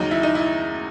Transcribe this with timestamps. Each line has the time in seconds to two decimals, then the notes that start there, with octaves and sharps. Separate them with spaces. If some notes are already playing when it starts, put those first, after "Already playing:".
Already playing: D#2 C#3 F#3 D#4
0.11 E4
0.23 D#4
0.35 E4